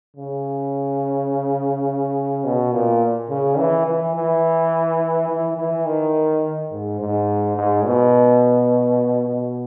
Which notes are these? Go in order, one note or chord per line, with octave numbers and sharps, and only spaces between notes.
C#3
B2
A#2
C#3
E3
E3
E3
E3
E3
D#3
G#2
G#2
G#2
B2
B2